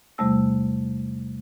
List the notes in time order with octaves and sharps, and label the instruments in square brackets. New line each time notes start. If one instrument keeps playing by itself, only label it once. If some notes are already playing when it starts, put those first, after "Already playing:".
[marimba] E2 C3 G3 A3 E6